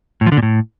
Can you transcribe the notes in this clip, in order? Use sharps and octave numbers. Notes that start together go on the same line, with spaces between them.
A2
F3
D3
A#2
A2